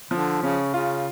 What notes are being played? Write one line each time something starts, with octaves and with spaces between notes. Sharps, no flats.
D3 F3
C#3 C#4
C#3 F4